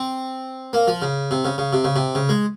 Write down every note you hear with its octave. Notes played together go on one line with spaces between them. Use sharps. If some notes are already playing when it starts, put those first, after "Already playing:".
Already playing: C4
A#3
F3
C#3
C3
C#3
C#3
C3
C#3
C3
C#3
G#3